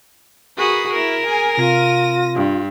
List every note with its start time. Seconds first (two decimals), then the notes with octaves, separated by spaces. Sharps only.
0.57 F#4 G#4 A#4 B4 D#6
0.93 E4 A#4
1.26 G#4 G#5
1.57 C3 F4 A#6 D#7
2.35 G2